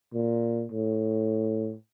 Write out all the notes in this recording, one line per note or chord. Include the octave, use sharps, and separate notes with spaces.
A#2
A2